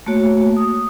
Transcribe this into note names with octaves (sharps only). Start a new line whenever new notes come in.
A3 A#3 F#4 C#5
D#6